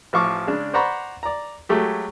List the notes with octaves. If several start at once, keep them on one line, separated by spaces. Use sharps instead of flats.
A1 F3 F5 C#6 D6
C#3 G#3 D4
C5 D5 F#5 A#5 B5 C#6
D5 A#5
F#3 G#3 A3 G4